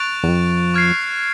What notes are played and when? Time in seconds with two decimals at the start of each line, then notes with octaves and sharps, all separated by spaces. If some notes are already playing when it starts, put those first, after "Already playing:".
Already playing: C#6 F#6 A6 D7 F7
0.23 E2
0.28 F2
0.74 C#6 F6 G#6 C7